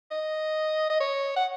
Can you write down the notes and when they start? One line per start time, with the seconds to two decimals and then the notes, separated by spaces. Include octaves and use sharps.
0.11 D#5
0.90 D#5
1.00 C#5
1.36 F#5